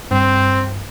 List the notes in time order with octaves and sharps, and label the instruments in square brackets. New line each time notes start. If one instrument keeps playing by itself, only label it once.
[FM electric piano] G2 [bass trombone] C4